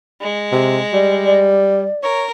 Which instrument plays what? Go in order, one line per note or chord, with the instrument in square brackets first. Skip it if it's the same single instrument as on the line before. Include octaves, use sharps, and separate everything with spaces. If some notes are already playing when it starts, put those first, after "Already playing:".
[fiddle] G#3
[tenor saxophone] C3
[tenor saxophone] G3 [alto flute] D5
[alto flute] D5
[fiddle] A#4 [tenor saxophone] C#5